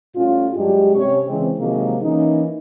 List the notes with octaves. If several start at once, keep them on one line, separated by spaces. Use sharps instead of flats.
A2 G3 C#4 F4
G2 F#3 G#3 D4 G4
C3 C#4 C#5
C#3 E3 G#3 C4
C3 D#3 F3 F#3 G#3 A#3
E3 A#3 C#4 D#4